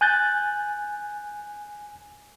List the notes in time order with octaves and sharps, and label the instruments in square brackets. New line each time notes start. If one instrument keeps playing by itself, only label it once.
[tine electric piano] G#5 F#6 G6 A6